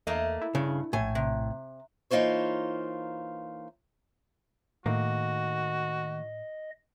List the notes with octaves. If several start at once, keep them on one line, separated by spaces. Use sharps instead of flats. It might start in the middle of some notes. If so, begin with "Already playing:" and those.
E2 A3 A#3 D#5
E4
G2 C#3
A#1 A2 G#5
C3
E3 A#3 D#4 F4 C5 C#5
A2 D#3 A3 A#3 F#4 D#5